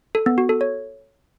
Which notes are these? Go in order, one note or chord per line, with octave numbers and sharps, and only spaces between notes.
A4
B3
F#4
A4
C#5